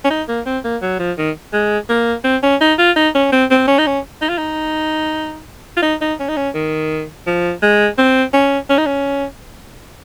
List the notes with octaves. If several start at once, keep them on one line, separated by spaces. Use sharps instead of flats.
C#4
D#4
A#3
C4
A#3
F#3
F3
D#3
G#3
A#3
C4
C#4
D#4
F4
D#4
C#4
C4
C4
C#4
D#4
C#4
D#4
F4
D#4
F4
D#4
D#4
C#4
D#4
C#4
D#3
F3
G#3
C4
C#4
C#4
D#4
C#4